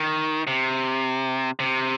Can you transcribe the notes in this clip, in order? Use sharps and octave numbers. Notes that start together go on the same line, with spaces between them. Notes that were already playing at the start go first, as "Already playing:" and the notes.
Already playing: D#3
C3
C3